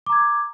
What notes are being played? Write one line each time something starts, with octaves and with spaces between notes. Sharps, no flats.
A#5 D6 G#6